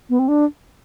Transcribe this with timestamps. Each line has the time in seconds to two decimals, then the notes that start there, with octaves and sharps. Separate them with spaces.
0.09 B3
0.19 C4
0.28 D4